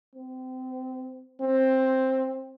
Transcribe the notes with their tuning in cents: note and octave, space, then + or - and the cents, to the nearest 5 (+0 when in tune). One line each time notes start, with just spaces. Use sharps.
C4 -25
C4 +10